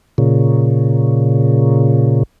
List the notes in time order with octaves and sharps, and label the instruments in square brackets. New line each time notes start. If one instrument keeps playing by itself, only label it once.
[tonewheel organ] A#2 C#3